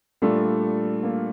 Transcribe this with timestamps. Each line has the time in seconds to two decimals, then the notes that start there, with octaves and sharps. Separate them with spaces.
0.22 A#2 G3 A3 D4 F4 A4
1.03 A#3